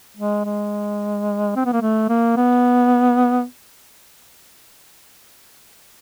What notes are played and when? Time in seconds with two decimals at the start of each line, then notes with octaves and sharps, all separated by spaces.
0.17 G#3
0.45 G#3
1.56 C4
1.66 B3
1.73 A#3
1.82 A3
2.09 A#3
2.37 B3